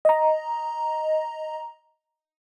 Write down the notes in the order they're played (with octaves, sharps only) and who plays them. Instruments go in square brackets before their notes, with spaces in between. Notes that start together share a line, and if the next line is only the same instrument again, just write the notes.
[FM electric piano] D#5 A#5